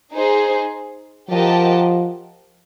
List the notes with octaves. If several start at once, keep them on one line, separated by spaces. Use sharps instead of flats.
D#4 G#4 C5
F3 G4 A#4 D#5 F#5 A5